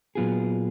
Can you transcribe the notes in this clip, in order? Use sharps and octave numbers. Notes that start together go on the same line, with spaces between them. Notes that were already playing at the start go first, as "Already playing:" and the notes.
A#2 F#3 B3 F4 G#4